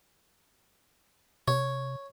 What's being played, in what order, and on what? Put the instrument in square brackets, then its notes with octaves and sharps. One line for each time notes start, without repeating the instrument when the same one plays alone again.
[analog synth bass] C3 [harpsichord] C#5